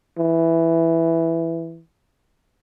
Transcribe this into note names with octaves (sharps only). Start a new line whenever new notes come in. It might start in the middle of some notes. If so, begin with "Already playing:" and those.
E3